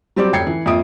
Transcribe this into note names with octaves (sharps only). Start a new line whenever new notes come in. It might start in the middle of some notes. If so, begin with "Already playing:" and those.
F#3 G3 C4 G4 D5 D6
F1 C#5 G5 G#6 C7 C#7
E3
F2 A#3 F4 E5 D#6 D7